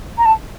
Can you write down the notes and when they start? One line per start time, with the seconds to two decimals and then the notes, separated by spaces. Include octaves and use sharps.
0.18 A#5
0.25 A5